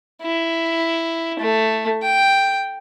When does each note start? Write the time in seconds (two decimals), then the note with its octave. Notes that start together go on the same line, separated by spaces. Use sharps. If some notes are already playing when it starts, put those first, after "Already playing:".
0.23 E4
1.39 A3
2.02 G5